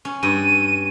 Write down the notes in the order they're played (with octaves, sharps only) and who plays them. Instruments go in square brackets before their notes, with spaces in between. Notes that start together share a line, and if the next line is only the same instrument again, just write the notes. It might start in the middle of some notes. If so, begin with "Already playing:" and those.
[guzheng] C#4
[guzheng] G2 [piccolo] D#7